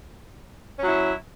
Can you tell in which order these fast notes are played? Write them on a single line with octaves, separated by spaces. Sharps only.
C#4 F#3 E4